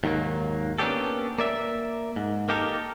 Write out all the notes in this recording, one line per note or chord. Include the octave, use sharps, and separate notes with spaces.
D#2 G#2 D#3 F#3 A#3
A#3 B3 C#4 D4 G4 A4
A#3 D5 E5
G#2
A#3 D#4 G4 A4 A#4